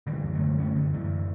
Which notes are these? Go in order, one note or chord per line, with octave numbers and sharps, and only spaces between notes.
D3 E3 G3
F#2
F#3 A3
D3
F#2 A3 C#4
F#2 D3
F#2 E3